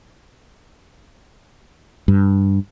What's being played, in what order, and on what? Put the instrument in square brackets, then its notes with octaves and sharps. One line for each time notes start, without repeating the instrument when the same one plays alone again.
[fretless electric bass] G2